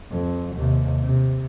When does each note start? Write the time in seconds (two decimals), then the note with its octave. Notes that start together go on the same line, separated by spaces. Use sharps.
0.10 F2
0.57 D#2 C3
1.02 C3